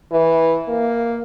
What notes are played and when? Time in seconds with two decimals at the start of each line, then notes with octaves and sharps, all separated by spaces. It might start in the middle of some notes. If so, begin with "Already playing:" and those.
0.11 E3
0.68 A#3